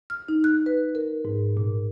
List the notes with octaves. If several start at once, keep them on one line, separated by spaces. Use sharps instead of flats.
F6
D#4
F#6
B4
A#4
G#2
A#2